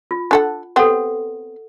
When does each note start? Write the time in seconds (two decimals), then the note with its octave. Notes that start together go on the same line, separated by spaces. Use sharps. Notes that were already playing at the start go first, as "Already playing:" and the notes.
0.11 F4
0.31 D4 A4 F#5
0.76 B3 C4 G4 A4 F#5